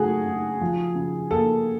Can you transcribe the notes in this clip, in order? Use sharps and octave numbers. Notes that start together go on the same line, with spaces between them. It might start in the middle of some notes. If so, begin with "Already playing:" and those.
Already playing: C#3 F#3 A3 F#4 G#4
C#3
F3
C#3
A#3 A4